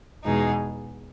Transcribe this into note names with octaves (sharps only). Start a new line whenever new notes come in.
E2 B2 G#3 D#4 G#4